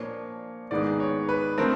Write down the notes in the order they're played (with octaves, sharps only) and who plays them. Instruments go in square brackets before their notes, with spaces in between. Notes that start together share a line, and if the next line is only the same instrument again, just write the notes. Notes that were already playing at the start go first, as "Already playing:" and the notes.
Already playing: [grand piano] A#2 F3 A#3 D4 C#5
G#2 D#3 G#3 B3 D#4 D5
C#5
B4
D3 F3 A3 C4 A#4